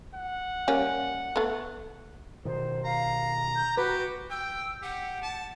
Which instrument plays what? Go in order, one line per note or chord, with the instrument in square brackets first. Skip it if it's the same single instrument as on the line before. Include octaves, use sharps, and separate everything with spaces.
[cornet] F#5
[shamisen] G3 A#3 C#4
A3 B3
[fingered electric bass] B2 D#3 [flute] C5
[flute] F5 [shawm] A#5
[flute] G6
[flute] F#4 [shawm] G4 [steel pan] B4
[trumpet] G5 [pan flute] E6
[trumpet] G4 [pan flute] F#5
[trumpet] A5